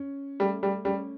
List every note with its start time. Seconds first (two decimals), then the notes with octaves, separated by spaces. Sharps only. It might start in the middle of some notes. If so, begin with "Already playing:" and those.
Already playing: C#4
0.40 G3 A3
0.63 G3
0.85 G3 C#4